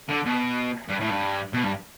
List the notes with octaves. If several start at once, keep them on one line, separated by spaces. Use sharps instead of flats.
D3
B2
G2
A2
G2
B2
G2